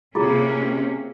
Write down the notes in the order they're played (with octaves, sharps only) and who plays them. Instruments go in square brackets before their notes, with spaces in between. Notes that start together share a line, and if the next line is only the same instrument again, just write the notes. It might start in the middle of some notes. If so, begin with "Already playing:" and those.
[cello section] C3 A#3 C#4 [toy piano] E4 F4 G#4